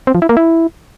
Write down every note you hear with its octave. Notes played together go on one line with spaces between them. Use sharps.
C4
F3
E4
A#3
E4